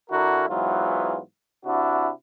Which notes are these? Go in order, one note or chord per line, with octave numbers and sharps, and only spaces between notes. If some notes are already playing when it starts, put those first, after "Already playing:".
D3 E4 F#4 A#4
G#2 E3 F#3 B3 F4
C3 D4 E4 F#4